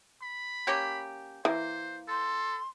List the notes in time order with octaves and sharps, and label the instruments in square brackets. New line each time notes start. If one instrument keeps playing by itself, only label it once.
[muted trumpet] B5
[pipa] A#3 C#4 G4
[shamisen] E3 [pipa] A#3 [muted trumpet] C5
[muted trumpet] A4 [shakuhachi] C6